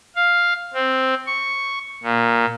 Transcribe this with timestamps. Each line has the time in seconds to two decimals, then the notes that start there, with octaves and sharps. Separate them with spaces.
0.16 F5
0.74 C4
1.27 C#6
2.03 A#2